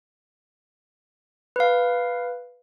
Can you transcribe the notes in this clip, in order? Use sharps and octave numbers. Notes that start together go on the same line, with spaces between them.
B4 F5